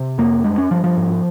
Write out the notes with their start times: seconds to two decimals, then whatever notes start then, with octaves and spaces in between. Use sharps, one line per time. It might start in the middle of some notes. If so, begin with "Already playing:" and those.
Already playing: C3
0.18 F2 A#3
0.44 G2 G#3
0.58 C#4
0.71 G2 F3
0.84 F3
0.97 G#2